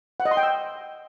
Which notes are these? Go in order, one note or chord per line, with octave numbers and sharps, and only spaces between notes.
F#5
D#5
C6
G5
E6